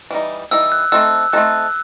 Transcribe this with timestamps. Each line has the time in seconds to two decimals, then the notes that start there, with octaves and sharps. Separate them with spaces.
0.11 E3 G3 D#4
0.51 E3 G3 D#4 E6
0.72 F#6
0.92 A3 C4 D#4 A4 E6
1.33 A3 C4 D#4 A4 F#6